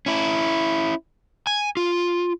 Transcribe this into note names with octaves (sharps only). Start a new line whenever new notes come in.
C#4 E4
G#5
F4